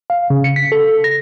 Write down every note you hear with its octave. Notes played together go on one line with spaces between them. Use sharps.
F5
C#3
C#7
B6
A4
A#6